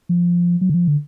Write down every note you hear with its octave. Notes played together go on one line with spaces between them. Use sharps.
F3
F#3
D3
F3
D3